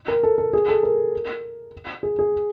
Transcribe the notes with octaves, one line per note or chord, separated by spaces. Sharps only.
A#4
A4
A4
G#4
A4
A#4
G#4
G#4